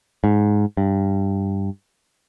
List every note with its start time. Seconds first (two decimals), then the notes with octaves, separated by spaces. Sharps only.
0.24 G#2
0.77 G2